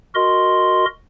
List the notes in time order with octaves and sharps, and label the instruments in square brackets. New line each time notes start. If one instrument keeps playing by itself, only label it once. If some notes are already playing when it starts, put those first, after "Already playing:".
[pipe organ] F#4 A#4 D#5 C6